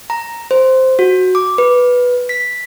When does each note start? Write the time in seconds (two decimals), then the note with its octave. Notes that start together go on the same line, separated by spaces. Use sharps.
0.10 A#5
0.51 C5
0.99 F#4
1.35 D6
1.58 B4
2.29 B6